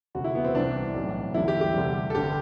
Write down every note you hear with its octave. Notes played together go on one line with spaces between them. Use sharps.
E1 D2 C3 F#4
E4
B3
C4
C2 C3 E3 G3 D4
B1 A2 E3
E2 D3 G3 E4
G4
G4
D2 C3 G3
A4
G1 G2 D3 G4